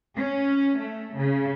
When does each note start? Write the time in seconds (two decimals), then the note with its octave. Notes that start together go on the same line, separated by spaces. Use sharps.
0.15 C#4
0.78 A3
1.18 C#3